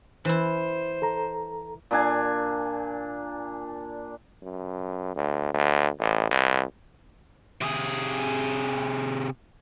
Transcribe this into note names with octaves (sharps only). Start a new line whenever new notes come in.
E3 E4 C5
A4 A#5
A#2 D4 G#5
F#2
D2
D2
A1
C2
C3 G#4